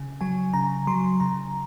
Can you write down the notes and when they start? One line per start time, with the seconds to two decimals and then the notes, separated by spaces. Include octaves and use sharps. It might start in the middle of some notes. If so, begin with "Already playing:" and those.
Already playing: C#3
0.21 F#3 G#5
0.53 C#3 A#5
0.87 F#3 C6
1.20 C#3 A#5